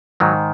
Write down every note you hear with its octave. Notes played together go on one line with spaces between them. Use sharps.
G#2 D#3 F#3